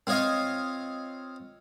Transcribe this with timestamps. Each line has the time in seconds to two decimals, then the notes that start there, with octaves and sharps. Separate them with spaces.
0.07 C4 F4 C#5 D#5 F5